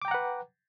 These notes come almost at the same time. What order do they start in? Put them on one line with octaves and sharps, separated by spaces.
D6 G5 A#5 F#5 B4